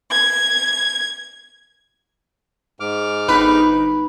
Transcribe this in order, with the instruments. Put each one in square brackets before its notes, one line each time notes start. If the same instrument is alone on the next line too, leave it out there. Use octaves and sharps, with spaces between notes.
[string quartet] G#6
[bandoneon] G#2 D6 F6
[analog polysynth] G1 D#4 [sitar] B4